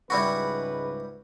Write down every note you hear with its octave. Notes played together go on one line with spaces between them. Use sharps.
C#2 G#2 G3 E4 F#4 B4